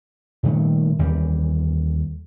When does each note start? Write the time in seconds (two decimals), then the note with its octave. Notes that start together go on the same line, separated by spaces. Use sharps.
0.43 A#2 D#3 G3 A3
0.99 D#2 E3 G3